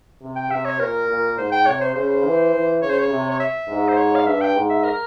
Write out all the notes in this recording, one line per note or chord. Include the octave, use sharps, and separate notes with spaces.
C3
G5
C3 E5
C#5
A#2 A#4
A#2
G#2 C5
G5
C3 C#5
C5
C#3 C5
C5
E3
E3
C#3 C#5
C5
C#5
C3
C#5
E5
G#2
C5
C#5
F5
G2 E5
G5
G#2
E5
A#4